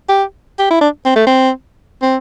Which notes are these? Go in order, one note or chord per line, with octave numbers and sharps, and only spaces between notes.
G4
G4
E4
D4
C4
A3
C4
C4